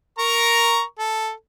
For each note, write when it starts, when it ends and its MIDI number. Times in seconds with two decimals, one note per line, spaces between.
0.19 0.82 70
0.19 0.82 82
0.19 0.82 85
0.99 1.31 69